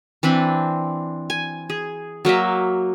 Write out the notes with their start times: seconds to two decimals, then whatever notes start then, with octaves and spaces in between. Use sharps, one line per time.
0.23 E3 C4 D4 B5
1.30 G#5
1.70 G#4
2.25 F#3 A#3 D#5 E5